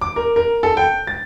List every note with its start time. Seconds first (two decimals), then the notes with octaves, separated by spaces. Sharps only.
0.01 D6
0.16 A#4
0.36 A#4
0.63 A4
0.77 G5
1.07 A6